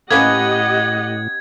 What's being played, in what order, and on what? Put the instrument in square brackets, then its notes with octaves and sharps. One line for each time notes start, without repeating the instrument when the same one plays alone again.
[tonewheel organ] A2 [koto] A#3 B3 C#4 [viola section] G4 D#5 F#5 [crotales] G#6